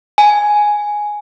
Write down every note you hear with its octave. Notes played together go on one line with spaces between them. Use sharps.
G#5